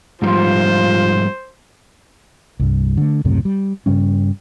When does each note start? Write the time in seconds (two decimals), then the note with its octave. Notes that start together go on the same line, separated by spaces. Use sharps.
0.22 G#2 F3 G3 F4 C5
2.60 C2 G2
2.97 D3 A3
3.25 C#2 F#2 A2 C3
3.45 G3
3.86 G2 C#3 G3 C#4